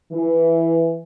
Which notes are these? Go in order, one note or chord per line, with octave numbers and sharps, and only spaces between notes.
E3